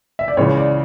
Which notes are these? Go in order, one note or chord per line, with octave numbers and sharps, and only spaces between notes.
E5
D5
C#2 C#3 E3 C#5
D5